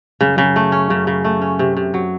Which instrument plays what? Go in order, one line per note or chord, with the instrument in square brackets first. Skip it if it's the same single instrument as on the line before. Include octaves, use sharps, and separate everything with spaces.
[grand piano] F#2 [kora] C#3
[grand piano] F#2 [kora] C#3
[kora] A3
C#4
[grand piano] F#2 [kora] C#3
[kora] C#3
A3
C#4
C3
C3
F#3